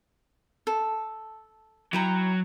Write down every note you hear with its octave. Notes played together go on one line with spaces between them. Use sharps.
A4
F#3 E4 G5 A#5